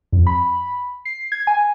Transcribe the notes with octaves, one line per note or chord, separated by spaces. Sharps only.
F2
B5
C7
G#6
G#5